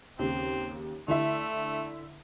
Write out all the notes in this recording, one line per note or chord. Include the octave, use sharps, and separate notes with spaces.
D#2 C#3 C4
D3 A3 E4 E5